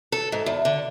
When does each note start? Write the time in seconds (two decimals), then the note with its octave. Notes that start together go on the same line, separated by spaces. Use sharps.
0.12 A4
0.32 G#2
0.46 E2
0.65 D3